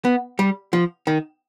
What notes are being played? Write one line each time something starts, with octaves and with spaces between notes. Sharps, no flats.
B3
G3
F3
D#3